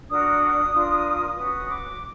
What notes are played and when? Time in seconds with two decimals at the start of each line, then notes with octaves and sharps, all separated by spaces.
0.09 D4 F#4 A#4 D#6
0.73 D4 F4 A#4
1.36 C#4 F#4 B4 D#6
1.68 D6